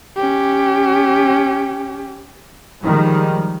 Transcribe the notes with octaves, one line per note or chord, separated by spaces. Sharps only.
C#4 G4
D#3 F3 G3 G#3